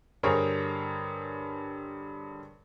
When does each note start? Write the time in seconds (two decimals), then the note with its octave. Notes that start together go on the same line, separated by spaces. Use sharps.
0.23 G2 D3 G#4 A#4 C5 C#5